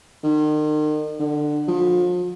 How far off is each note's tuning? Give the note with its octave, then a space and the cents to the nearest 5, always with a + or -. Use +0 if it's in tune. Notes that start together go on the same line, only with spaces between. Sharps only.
D#3 -40
D3 +20
F3 +35